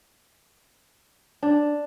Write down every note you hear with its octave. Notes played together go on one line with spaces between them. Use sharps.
D4